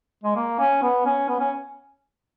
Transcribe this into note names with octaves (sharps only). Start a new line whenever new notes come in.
G#3
A#3
C#4
B3
C#4
B3
C#4